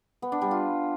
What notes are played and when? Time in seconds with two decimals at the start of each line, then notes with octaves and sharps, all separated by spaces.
0.22 B3
0.32 D4
0.41 G3
0.51 F4